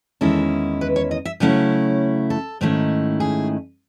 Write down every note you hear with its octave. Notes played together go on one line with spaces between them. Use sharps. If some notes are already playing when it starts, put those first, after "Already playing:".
E2 D#3 G#3 C#4 E4 A4
B4
C#5
D#5
E5
C#3 F#3 A3 C#4 E4 G#5
A4
G#2 D#3 A3 C#4 E4
G#4